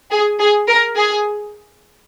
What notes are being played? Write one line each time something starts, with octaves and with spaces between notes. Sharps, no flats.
G#4
G#4
A#4
G#4